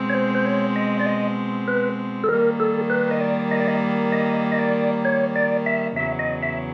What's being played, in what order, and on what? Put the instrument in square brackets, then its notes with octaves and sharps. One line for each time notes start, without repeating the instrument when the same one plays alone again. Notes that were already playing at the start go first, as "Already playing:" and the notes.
Already playing: [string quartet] B2 G#3 C4
[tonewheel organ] C#5
C5
C5
C#5
D#5
D5
D#5
B4
A4
[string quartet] D#3 G3 A#3 [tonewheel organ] A#4
[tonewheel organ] A4
B4
D#5
D5
D#5
D5
D#5
D#5
D#5
D5
C#5
D5
E5
[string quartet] E2 C#3 F#3 [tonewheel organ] E5
[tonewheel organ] D#5
E5